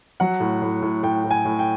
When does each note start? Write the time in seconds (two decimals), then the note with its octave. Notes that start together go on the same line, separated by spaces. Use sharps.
0.20 F#3 F#5
0.40 A2
0.62 A2
0.82 A2
1.03 A2 G5
1.24 A2
1.31 G#5
1.45 A2
1.59 G5